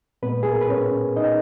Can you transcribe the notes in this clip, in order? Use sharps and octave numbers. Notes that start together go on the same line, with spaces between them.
A#2 G#3 B3 B4
G#4
A#4
B4
C#4 C#5
D#4 D#5